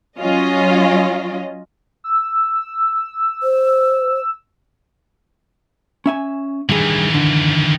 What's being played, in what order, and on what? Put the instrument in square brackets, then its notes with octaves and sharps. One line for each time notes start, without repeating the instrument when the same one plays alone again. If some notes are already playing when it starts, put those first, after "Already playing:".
[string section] F#3 C#4 F4 D#5
[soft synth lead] E6
[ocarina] C5
[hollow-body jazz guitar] C#4 E5 G#5
[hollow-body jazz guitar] G2 G#4 [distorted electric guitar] D#3 E3
[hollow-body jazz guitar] D3